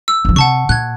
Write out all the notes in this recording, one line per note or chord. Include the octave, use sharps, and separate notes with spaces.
E6
G1 F3
C3 F#5 A5 C#6
A#2 F#6 G#6